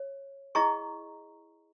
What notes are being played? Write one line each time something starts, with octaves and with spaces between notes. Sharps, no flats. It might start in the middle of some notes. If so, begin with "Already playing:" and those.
Already playing: C#5
E4 G#4 D#5 A#5 C#6